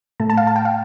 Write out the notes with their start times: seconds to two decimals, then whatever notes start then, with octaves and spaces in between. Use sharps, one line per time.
0.20 A2 A3 A5
0.30 A5
0.37 F5
0.47 A5
0.56 G5
0.65 F5